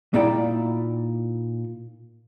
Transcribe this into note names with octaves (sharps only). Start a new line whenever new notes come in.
A#2 A#3 D#4 E4 D5 G5